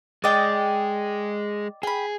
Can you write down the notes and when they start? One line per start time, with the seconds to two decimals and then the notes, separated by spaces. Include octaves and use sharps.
0.24 G#3 D5 D#5 G5
1.83 G#4 G5 B5